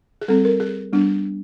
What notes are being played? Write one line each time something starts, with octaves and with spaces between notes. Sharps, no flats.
G#4
G3 C4 A4
A#4
G#4
G3 B3 D4